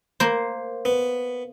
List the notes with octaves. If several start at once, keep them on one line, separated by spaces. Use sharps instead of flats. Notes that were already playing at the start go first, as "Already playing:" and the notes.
A#3 C5
B3